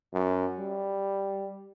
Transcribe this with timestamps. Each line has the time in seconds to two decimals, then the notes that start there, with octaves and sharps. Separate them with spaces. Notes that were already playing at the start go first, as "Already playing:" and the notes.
0.13 F#2
0.59 G3